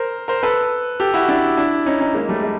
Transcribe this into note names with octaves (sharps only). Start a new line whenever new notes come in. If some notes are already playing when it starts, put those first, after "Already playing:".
Already playing: A#4 C5
A#4 C5
A4 B4
G4 A4
E4 F#4
D4 E4
D4 E4
C#4 D#4
C#4 D#4
G#3 A#3
G3 A3
G#3